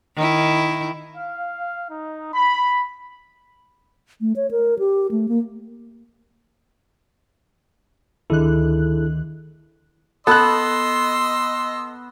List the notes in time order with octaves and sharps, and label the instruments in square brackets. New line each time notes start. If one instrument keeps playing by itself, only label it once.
[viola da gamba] D#3 E4
[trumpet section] F5
D#4
B5
[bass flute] A3
C#5
A#4
G4
A3
A#3
[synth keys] D2 D#3 F#6 [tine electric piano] E4 G#4 A4
[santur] B3 [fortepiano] A4 F#6 [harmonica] D#5 C6 E6